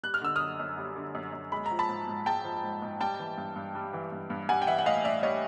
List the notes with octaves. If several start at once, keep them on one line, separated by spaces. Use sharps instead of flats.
G3 F#6
F6
D3 E6
F#2 D#6 F6
F#2
G3
D3
F#2
F#2
G#3 B5
A#5
F3
A5 B5
G#2
G#2
G#3 G5 A5
F3
G#2
G#2
G3 G5 A5
E3
G2
G2
G3
E3
G2
G2
G3 F#5 G#5
G5
E3 E5 F#5
F#5
A2 D#5 F5
A2 D5 E5
G3 C#5 D#5